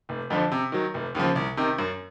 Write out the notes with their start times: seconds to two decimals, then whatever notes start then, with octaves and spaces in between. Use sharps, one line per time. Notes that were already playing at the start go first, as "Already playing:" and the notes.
0.09 F1
0.30 F2 D3 F3
0.52 C3
0.72 D#3 F#3
0.94 F1
1.15 D#2 C#3 F3
1.36 C2
1.57 C3 D#3
1.78 F#2